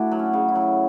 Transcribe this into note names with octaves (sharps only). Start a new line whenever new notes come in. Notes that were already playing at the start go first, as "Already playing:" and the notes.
Already playing: A2 A3 D4 E4 F#4
F#3
C#4
C#3
E4
F#3